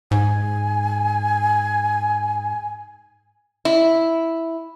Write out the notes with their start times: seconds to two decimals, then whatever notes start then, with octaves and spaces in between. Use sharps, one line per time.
0.11 G#2 G#5
3.65 E4